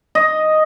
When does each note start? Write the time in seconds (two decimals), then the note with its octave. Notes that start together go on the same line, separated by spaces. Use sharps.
0.15 D#5